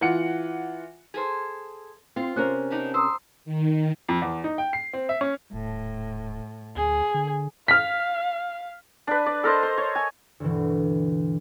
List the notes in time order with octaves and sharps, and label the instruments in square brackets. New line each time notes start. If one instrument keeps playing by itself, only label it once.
[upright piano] E3 F4 F#5 C#7
[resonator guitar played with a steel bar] G#4 A4 C5
[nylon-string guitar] C4 [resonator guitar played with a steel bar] F4
[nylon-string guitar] C3 C#4 A#4 [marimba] C5 F#6
[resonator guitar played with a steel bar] B3 D4 D#4
[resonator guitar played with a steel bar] C5 [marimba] A#5 D#6 E6
[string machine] D#3
[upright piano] F2
E2
D#4
G5
C7
C4
E5
C#4
[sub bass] D#1 [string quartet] A2
[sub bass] D2 [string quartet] G#4
[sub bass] D3
[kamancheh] F5 [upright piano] F6 B6
[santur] D4 B4
D5
A4 A#4 C5 D#5
C5
C#5
G#5
[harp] D2 G2 B2 E3